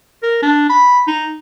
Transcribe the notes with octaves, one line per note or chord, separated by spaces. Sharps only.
A#4
D4
B5
D#4